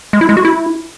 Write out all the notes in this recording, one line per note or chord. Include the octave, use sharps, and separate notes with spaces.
G#3
E4
G#3
F#4
E4